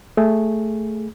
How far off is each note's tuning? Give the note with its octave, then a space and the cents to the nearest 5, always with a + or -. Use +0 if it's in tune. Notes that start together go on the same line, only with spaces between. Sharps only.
A3 +0 G#4 +0